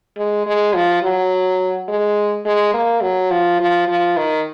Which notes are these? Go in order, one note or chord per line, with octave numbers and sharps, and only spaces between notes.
G#3
G#3
F3
F#3
G#3
G#3
A#3
F#3
F3
F3
F3
D#3